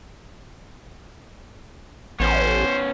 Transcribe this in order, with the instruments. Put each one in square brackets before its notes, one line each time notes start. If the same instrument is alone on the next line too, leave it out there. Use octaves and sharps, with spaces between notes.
[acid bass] A1 [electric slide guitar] B3 C#4 [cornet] C5